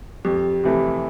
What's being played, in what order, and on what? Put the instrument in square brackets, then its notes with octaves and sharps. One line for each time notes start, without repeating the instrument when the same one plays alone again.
[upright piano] F2 [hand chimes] G4
[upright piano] C3 E3 A3